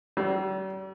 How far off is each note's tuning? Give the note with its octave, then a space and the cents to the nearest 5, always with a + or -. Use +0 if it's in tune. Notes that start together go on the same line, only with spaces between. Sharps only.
G3 -45